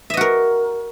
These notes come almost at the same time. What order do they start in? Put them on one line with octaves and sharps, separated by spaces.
E5 D#5 F#4 A#4